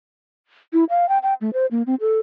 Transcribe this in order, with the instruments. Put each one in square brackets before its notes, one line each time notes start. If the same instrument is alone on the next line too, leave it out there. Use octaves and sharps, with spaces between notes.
[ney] E4
F5
G5
G5
A3
C5
A#3
C4
A4